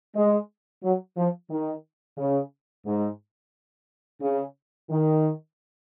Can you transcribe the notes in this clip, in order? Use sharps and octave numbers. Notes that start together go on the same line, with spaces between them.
G#3
F#3
F3
D#3
C#3
G#2
C#3
D#3